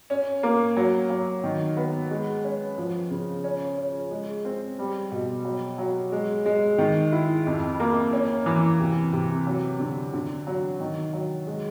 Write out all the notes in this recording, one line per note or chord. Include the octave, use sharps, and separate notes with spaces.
C#4
A#3
F#3
F#3
D#3
B3
G#3
C#4
F3
C#3
C#4
C#4
G#3
C4
G3
B2
F#3
F#3
G#3
G#3
D#3
E4
F2
A#3
C#4
E3
C3
C3
F#3
D3
D3
F#3
D#3
F#3
G#3